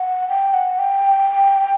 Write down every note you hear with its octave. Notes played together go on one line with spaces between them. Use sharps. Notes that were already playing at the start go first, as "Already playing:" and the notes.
Already playing: F#5
G5
F#5
G5